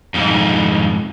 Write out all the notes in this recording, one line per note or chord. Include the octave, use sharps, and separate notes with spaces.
F2 G#2